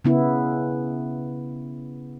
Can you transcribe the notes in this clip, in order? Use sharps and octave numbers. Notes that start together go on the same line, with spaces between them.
C#3 B3 E4